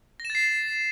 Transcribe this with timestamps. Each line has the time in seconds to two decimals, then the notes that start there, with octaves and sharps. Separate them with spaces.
0.20 A#6
0.25 E7
0.30 A6
0.35 C7